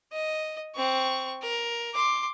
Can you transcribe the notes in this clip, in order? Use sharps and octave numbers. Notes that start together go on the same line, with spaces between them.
D#5
C4 C#6
A#4
C6 D6